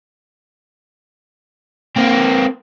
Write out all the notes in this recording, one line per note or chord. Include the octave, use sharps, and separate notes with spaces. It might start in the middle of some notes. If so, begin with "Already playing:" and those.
A#3 C4